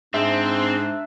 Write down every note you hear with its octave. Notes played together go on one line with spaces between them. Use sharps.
G#2 C4 D4 E5